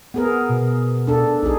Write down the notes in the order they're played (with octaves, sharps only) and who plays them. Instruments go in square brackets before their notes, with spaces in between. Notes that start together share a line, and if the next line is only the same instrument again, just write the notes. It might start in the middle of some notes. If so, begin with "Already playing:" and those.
[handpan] B3 G#4 A#4
[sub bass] B2
[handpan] D4 A4
[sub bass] B1 [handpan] D#4 G#4